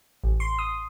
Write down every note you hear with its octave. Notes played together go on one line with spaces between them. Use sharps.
A1
C6
D#6